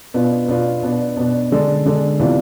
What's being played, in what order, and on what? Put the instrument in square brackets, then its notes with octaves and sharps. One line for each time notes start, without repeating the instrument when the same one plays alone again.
[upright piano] B2 B3 D4 F4
B2 B3 D4 F4
B2 B3 D4
B2 B3 D4
D3 G#3 D4 A4
D3 G#3 D4 A4
C3 E3 B3 D4 F4